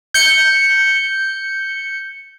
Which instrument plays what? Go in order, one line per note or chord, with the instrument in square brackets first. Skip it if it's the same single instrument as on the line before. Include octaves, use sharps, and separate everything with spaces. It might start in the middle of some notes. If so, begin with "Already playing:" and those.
[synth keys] G6 C#7